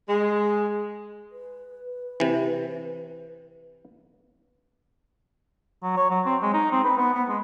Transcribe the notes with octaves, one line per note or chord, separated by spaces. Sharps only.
G#3
B4
C3 E3
F#3
C#5
F#3
C4
G#3
D#4
C4
B4
B3
B3
G#3